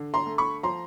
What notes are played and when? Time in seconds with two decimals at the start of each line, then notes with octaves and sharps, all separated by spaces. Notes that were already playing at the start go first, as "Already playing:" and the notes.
Already playing: D3
0.14 A#5 C6
0.26 A3
0.38 B5 C#6
0.63 F3 A#5 C6